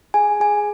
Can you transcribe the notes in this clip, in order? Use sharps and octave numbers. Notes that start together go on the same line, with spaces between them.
G#4 G#5
G#4 G#5